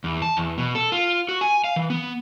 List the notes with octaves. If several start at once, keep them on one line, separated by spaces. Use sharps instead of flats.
E2
A5
E2
B2
A4
F4
F#4
G#5
F5
E3
B3